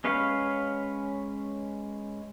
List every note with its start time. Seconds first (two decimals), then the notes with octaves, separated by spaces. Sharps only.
0.04 G#3 C#4 B4 C#5 F5